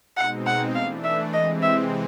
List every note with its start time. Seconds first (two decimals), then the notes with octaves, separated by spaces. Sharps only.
0.17 B2 G#3 C4 D#4 F#5
0.47 F#5
0.75 E3 A3 D4 F5
1.04 E5
1.33 C3 E3 G#3 C4 D#5
1.62 E5